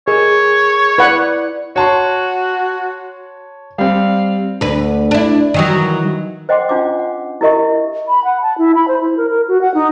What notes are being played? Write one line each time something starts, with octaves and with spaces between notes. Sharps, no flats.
G#4 A#4 C#5 D#5
E4 B4 D5 F#5
F#4 C#5 A5 C6
G3 C4 F5
D2 B4
D4 E4
D#3 E3 F#3
C5 D#5 F#5 G5 C6 D6
C#4 D4 F4 C5 D6
F#5
E4 G4 A#4 D#5 E5 C#6
B5
F#5
A5
E4
B5
C5
E4
A#4
A#4
F#4
F#5
D#4